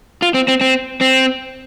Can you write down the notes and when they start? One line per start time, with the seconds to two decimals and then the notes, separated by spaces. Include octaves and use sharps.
0.22 F4
0.34 C4
0.48 C4
0.61 C4
1.01 C4